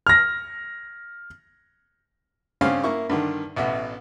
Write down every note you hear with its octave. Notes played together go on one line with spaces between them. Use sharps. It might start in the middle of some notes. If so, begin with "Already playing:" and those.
F6 A#6
G2 C#3 C4 C#4 F5 F6
A#3 E4 C#6
G2 D3 D#3
A1 B2 E5